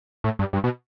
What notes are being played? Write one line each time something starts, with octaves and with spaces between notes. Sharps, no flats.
A2
G2
G2
B2